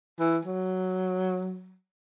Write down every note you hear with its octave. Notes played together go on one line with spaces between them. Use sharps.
E3
F#3